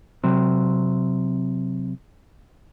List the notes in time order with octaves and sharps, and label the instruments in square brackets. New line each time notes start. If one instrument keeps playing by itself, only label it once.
[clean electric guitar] C3 F#3 C4